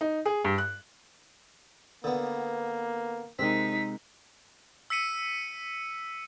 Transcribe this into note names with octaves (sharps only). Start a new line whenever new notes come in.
D#4
G#4
G2
F#6
D3 A#3 B3
C3 G#3 C4 D#4 A#4 B6
E6 B6 C#7 D#7